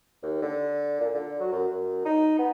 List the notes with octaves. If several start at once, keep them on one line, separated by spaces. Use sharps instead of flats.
D#2
D3
A#2
D3
F#3
F#2
F#2
D#4
B3